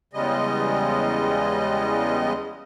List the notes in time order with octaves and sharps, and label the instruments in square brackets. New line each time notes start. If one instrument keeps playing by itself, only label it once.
[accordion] E2 C#3 G3 G#3 D#5